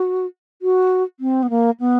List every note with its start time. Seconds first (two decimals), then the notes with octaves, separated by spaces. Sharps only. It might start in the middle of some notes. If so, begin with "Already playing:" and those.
Already playing: F#4
0.62 F#4
1.20 C4
1.43 B3
1.50 A#3
1.80 B3